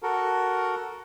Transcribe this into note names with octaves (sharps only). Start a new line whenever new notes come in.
F#4 A4 A#4